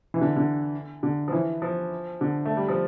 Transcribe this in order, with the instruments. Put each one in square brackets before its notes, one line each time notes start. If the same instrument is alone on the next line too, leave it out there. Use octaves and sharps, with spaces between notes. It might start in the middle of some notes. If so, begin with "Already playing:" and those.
[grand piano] E3
D3
D3
D3
F3
E3
F3
D3
A3
G3
F3